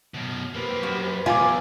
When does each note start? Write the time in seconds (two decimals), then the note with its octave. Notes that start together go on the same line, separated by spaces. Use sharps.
0.14 F#2 B2
0.54 F2 A#3 G4 B4 C5
0.83 F#2 F#4
1.26 E2 F4 G#5 D6